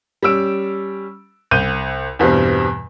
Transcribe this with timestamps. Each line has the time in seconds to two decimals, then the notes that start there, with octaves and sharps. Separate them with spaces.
0.23 G3 C#4 E6 D7
1.51 C2 G6 D#7
2.19 E2 G2 B2 G3 C4